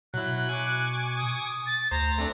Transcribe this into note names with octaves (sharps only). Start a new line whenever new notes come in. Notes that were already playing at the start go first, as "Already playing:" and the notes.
B2 F#3 E4 F#6
G#5 C#6 D6
D#6
A6
D2 C5 A#5
A3 C4 D4